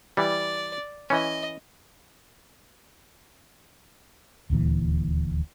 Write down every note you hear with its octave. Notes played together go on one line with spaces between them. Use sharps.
E3 G3 D5
E3 C#4 D#5
D#1 D2 A#2 E3